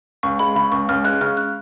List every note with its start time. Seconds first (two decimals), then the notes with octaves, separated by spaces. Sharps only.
0.23 C#2 C#6
0.39 G#3 B5
0.55 C#3 B5
0.71 C#2 C#6
0.89 C#2 F6
1.04 G#3 F#6
1.21 C#3 F6
1.37 F#6